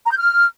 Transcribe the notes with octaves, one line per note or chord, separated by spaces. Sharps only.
A#5
G6
F6